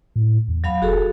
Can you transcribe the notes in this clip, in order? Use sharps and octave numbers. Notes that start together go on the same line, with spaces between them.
A2
E2
F#3 F5 B5
F1 F#4 G#4 A4